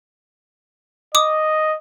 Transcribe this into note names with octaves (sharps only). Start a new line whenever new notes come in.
D#5 D6 D#6